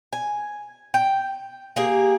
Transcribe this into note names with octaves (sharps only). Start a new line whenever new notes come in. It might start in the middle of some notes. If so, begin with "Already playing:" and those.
G#5
G5
A#3 G4 G#4